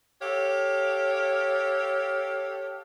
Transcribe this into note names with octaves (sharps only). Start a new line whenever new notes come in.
G4 A4 C#5 F5